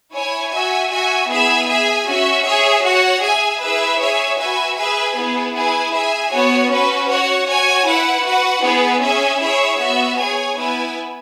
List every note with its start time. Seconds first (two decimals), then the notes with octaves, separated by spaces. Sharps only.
0.13 E4 C#5 G#5
0.51 F#4 E5 G#5
0.91 F#4 E5 G#5
1.29 B3 E4 G#4 E5 G#5
1.68 G#4 E5 G#5
2.06 C#4 F#4 E5
2.45 G#4 C#5 E5
2.83 F#4 C#5 F#5
3.23 G#4 E5 G#5
3.61 E4 G#4 B4 E5
3.99 G#4 C#5 E5 G#5
4.38 F#4 B4 E5 G#5
4.77 G#4 B4 E5 G#5
5.16 B3 E4 G#4 B4
5.55 E4 G#4 B4 G#5
5.93 G#4 E5 G#5
6.32 B3 F#4 C#5
6.70 C#4 F#4 B4
7.09 F#4 C#5 F#5
7.47 F#4 C#5 G#5
7.87 E4 B4 F#5
8.25 F#4 B4 F#5
8.63 B3 E4 G#4 B4
9.02 C#4 G#4 E5 G#5
9.41 E4 G#4 C#5 E5
9.80 B3 F#4 E5
10.18 G#4 C#5 G#5
10.57 B3 E4 B4 G#5